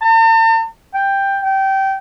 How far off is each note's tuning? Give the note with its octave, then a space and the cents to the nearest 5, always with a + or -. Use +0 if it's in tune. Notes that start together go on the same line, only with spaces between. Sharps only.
A5 +45
G5 +10
G5 -20